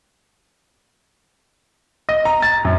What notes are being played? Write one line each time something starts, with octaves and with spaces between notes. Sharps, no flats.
D#5
A#5
A6
F#2